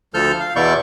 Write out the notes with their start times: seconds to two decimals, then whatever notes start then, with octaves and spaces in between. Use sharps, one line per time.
0.14 D2 F3 A4 F6 G6
0.40 F5
0.56 E2 B2 E4 D5 C#6 G6